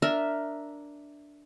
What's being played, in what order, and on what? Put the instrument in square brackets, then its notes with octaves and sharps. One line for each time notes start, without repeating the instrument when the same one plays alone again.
[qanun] D4 A#4 E5